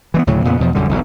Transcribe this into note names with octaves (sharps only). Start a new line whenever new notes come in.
E3 G#3 B3
D2 A2 C#3 F#3
F2 A#2 C#3 B3
E2 B2 F3
B1 F#2 D3 G3
E1 B1 G2